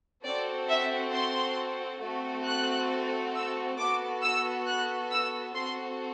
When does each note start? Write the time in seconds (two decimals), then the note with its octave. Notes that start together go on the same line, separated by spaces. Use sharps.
0.24 C4 F#4 A4 D5
0.69 E5
1.13 C6
2.01 A3 C4 F#4 A4
2.46 F#6
3.34 E6
3.78 B3 F#4 A4 D6
4.23 E6
4.66 F#6
5.10 E6
5.55 C4 F#4 A4 C6